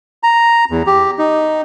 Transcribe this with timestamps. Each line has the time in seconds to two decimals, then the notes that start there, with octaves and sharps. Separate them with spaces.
0.23 A#5
0.71 E2
0.87 G4
1.19 D#4